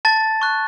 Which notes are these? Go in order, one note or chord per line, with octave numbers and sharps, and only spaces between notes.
A5 A6
C#6 F#6